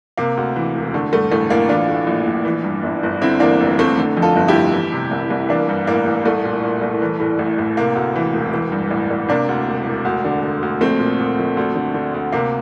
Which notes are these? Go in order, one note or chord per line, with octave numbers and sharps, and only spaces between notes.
C3 A#3
D2
E3
E1
D3 A3
G2 A3
A1 A3
A1 A#3
E3 D4 F4
A2
A#1
A#1
E3
G2
G1
G1
D3 C4 E4
E2 A#3 D4
F1
F1 A3 C4
D3
F2
F4 A4
G1
E4 G4
G1
E3
C3
C2
C2
E3 A#3 D4
G2
A1 A#3
A1
C2 A3
A#2
A#2
C2
E3
A2
A1
A1
C3 A#3
D2
E3
E1
E3
G2
A1
A1
C3 A#3 D4
D2
E1
E1
D2
D3
D3
D2
A#1 A3 C4
A#2
A#2
A#1
D2
D3
D3
D2
C3 A#3